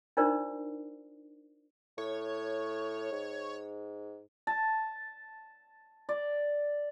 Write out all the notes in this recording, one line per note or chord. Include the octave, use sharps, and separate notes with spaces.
D4 D#4 F4 A#4 C5 D5
A2 C#5
G#2
A5
D5